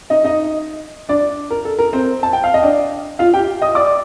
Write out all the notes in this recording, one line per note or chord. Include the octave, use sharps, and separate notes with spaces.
D#4 D#5
D#4 D#5
D4 D5
A#4
A4
A#4
C4 C5
A5
G5
F5
D#5
D4 D5
F4 F5
G4 G5
D#5 D#6
D5 D6